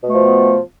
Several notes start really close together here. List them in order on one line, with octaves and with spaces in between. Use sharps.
B2 A3 F3 B3